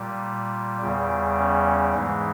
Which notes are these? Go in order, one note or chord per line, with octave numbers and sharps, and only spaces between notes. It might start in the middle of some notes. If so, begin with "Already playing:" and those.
Already playing: A#2 G3
E2 C#3 G3
C#4
G#2 E3 G#3